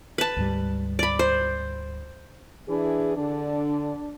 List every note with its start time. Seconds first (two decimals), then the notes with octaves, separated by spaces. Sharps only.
0.18 B4 A5
0.37 D2 G#2 G3
0.99 D5 B5
1.19 C5
2.68 E3 D4 E4 G#4
3.17 D3 D4